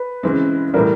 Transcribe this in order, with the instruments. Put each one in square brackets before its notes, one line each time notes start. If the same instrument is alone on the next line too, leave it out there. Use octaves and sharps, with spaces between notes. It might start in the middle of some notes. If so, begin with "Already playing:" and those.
Already playing: [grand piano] B4
[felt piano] C#3 E3 G#3 C4
[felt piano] A2 E3 G3 [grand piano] A#4